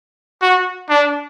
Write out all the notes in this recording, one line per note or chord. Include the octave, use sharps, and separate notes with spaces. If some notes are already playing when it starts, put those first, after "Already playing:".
F#4
D4